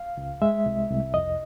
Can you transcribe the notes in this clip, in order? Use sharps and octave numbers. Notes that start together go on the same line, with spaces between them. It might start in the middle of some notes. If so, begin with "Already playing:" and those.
Already playing: F5
C#2
G#3 E5
C2
C2
F2 D#5